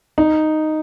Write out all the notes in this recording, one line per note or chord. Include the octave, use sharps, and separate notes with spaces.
D#4